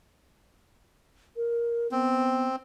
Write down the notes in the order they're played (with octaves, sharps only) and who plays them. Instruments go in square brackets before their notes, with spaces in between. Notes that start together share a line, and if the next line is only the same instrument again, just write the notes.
[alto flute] A#4
[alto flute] B3 [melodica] C4